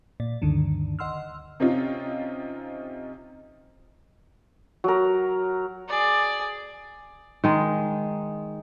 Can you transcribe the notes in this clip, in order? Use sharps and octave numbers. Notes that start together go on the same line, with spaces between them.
A#2 D5
D2 G2 D3 D#3
D#5 F#5 C6 E6 F6
C3 C4 C#4 D#4 F4
F#3 A#4
G#4 D5
D#3 G#3